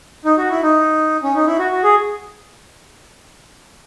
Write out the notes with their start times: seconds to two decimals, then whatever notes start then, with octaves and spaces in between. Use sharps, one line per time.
0.25 D#4
0.38 F#4
0.50 E4
0.62 D#4
1.23 C#4
1.35 D#4
1.46 E4
1.59 F#4
1.71 F#4
1.84 G#4